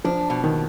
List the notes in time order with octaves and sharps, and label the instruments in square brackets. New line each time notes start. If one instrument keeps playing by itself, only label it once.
[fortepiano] F3 [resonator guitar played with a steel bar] D4
[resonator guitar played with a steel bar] B2
[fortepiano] D#3